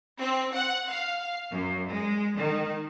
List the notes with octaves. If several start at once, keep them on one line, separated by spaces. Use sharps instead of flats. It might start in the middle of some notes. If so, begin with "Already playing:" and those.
C4
F#5
F5
F#2
G#3
D#3